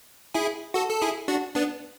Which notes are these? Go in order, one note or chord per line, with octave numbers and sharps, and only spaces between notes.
E4 G#4
F#4 A4
A4
E4 G#4
D4 F#4
B3 D4